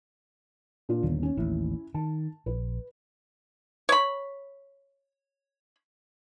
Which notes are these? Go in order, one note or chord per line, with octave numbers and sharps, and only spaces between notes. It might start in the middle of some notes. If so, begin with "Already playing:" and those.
A#2 D4 F4
G1 D#2
C#4
A1 D#2 C#4 E4
D#3 A5
A#1 B4
C#5 B5